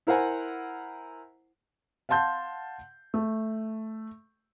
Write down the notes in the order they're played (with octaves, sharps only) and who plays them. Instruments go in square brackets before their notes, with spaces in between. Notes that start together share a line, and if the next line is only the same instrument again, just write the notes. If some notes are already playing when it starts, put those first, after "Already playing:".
[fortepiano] E4 A#4 C5 F#5 G#5
[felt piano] F5 F#5 A5 C6 G6
A3